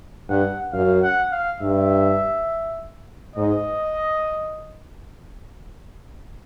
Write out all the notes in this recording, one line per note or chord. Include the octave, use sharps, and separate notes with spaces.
G2 F#5
F#2 F5
F#5
F5
G2 E5
G#2 D#5